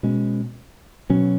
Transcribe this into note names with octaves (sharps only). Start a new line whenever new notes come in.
B2 G#3 C#4
B2 F#3 C#4